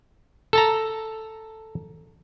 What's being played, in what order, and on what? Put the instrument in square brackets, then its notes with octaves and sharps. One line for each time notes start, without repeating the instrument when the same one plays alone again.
[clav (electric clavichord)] A4 A5 A#5